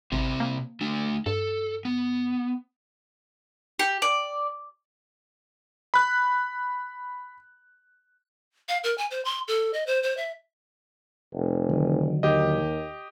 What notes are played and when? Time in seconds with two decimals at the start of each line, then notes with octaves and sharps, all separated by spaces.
0.12 G#1 C3 G3 C4
0.40 A#3
0.81 A3 D4
1.26 G2 A4
1.85 B3
3.79 G4
4.02 D5
5.94 B5 F#6
8.69 F5
8.84 A#4
8.98 G#5
9.11 C5
9.25 C6
9.48 A4
9.74 D#5
9.87 C5
10.03 C5
10.17 E5
11.34 F1
11.70 D3 D#3 F#3
12.23 D#2 G4 D#5